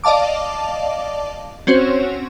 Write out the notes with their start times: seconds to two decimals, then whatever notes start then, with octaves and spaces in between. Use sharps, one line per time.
0.04 D5 D#5 F5 A5 D6
1.67 C4 C#4 F#4 C5 C#5